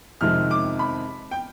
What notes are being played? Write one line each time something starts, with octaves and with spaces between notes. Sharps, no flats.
F2 C3 D#3 G#3 F6
D6
B5
G5